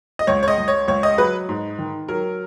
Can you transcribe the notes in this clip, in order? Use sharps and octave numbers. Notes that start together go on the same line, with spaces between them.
D#5
C#2 C#5
C#5
D#5
C#2
C#5
C#2 C#5
D#5
F#3 B4
G#2
D#3
F#3 A#4